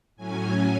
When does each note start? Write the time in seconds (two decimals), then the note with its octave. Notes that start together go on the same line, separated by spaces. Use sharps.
0.16 A2 F#3 C#4 G#5